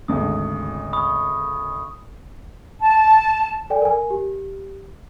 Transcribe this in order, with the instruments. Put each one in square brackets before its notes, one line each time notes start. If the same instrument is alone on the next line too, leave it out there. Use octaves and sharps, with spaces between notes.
[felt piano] G#1 D2 C#3 [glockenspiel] D#6
[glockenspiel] B5 C#6 D#6
[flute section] A5
[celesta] A4 D5 G5 G#5
A#4 G#5
G4